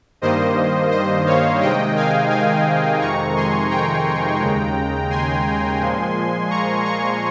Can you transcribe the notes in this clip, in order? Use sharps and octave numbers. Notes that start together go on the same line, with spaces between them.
G2 D#3 G3 A#3 C5 D#5
C5 D#5
C#5 F5
C3 D#3 G#3 D#5 G5
F5 G#5
F5 G#5
F2 C3 D#3 G#3 A#5 C#6
G#5 C6
G5 A#5
D#2 C#3 G#3
G#5 C6
A#2 F3 G#3
A#5 C#6
A#5 C#6